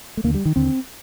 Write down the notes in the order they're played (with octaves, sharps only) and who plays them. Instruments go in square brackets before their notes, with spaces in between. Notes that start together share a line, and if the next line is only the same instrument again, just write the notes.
[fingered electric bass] A3
D#2 D3 A#3
G3
D#3
D#2 D3 C4